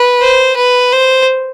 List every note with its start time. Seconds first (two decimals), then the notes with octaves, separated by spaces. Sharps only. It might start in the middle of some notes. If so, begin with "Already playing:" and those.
Already playing: B4
0.21 C5
0.57 B4
0.92 C5